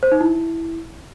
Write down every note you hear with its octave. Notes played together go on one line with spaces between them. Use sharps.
C5
D#4
E4